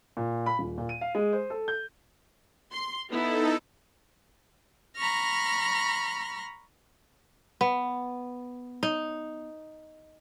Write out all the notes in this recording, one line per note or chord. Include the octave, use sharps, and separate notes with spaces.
A#2
B5
D#1
A#2
D#7
F5
G#3
C5
A4
G6
C6
B3 D#4 E4 A4
A#5 B5 C#6 F6 A#6
B3
D#4